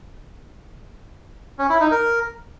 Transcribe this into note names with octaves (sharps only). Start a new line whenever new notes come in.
C#4
E4
D#4
A#4